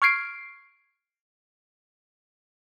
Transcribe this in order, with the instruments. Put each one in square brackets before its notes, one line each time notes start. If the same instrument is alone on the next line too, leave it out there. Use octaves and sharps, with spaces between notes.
[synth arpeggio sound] C#6 F6 G#6 C7 D7